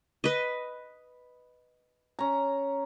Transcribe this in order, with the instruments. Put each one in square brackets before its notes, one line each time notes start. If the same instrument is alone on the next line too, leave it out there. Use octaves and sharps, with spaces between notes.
[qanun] B4 D#5
[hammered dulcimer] C#4 A#5